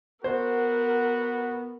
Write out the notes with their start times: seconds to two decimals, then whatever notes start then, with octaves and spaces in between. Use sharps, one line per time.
0.24 B3 F#4 A#4 C5